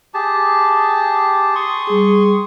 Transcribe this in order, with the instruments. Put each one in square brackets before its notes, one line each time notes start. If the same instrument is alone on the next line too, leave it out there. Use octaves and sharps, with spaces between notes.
[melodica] G4 G#4 A5
C6 C#6 D#6
[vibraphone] G3 G#4